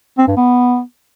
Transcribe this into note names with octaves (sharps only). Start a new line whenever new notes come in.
C4
G2
B3